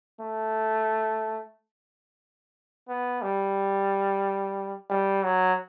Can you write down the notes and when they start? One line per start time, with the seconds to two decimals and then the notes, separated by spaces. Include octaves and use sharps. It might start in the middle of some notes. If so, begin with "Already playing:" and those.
0.20 A3
2.89 B3
3.22 G3
4.90 G3
5.23 F#3